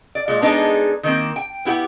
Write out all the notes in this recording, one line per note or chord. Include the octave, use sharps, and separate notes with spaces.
D5
A#2 G#3
G#3 B3 D4 D#4 G#4 A4
D#3 A#3 C4
G5
B3 E4 G4 F#5